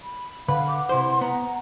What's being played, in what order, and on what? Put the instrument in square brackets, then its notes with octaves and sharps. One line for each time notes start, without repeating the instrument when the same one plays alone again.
[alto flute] B5
[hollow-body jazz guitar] D3 [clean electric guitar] B4 [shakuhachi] F5 [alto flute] F#5
[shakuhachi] D6
[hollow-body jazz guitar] C3 E4 C5 [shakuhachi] C6
[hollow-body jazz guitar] B3 [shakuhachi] A#5
[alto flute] F#5